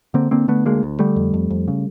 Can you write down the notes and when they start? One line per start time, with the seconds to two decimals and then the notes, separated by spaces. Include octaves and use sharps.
0.14 D3 A#3 C4
0.31 D3 A#3 C4
0.48 D3 A3 B3
0.65 D2 G#3 A#3
0.83 D2
0.99 D3 G3 A3
1.16 F2
1.34 F2
1.50 F2
1.68 C#3